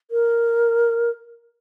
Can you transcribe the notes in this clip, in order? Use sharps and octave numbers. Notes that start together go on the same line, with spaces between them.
A#4